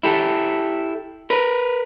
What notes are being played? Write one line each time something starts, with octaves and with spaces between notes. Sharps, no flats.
E4 G4 A4
A#4 B4